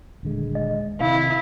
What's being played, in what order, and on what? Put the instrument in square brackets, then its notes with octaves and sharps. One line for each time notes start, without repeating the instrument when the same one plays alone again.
[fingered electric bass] D#1 D3 G#3
[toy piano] D#5
[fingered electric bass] C3 D#3 [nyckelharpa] E4 [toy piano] F5